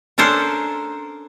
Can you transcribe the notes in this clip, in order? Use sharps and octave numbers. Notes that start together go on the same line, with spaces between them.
C#4 D4 A4 A#4 C5